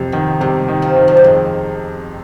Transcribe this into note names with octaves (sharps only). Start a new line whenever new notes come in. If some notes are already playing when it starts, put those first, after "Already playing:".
Already playing: F2 C3
D#3 B3
C3 G3
D#3
F3
D#3
F3
G3
F2 G#3